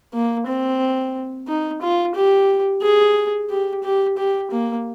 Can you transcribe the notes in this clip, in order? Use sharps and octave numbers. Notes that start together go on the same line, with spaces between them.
A#3
C4
D#4
F4
G4
G#4
G4
G4
G4
A#3